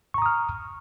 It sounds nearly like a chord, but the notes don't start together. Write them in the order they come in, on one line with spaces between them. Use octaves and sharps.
C#6 A#5 D#6 F6